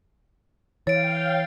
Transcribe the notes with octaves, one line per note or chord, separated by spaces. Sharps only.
E3 C#5 F5 G5 A6 D7